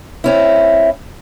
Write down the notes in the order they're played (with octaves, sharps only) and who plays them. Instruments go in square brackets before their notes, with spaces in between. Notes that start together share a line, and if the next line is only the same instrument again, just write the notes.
[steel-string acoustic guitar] C4 C#4 E4